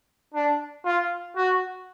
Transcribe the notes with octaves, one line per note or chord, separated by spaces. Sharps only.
D4
F4
F#4